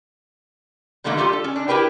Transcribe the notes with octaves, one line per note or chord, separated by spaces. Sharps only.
B2 D3 D#3 F#3 A3 A#3
G3 F4 G4 A4
A4
C#4
D4
E4 G4 A#4 B4 G5